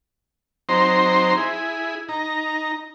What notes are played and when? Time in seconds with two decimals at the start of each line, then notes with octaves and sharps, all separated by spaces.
0.69 F#3 C4 D#4 C5 A#5 C6
1.37 E4 G#4
2.09 D#4 A#5